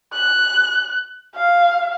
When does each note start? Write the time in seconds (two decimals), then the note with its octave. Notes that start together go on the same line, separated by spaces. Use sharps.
0.13 F#6
1.35 F5